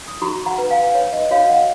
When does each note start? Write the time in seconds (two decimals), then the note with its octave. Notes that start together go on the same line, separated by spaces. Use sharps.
0.08 D#6
0.22 F#4 A#5 C#6
0.46 F#5 A#5
0.58 B4
0.70 F5 G#5
0.95 B4 C#5
1.13 D#5
1.31 F#4 C#5 F5
1.49 D#5 F#5